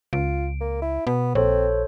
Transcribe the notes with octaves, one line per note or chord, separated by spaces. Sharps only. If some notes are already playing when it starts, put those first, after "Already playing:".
C#2 F4 D7
A#3
E4
B2 B3
A#1 C4 A4 C5 C#5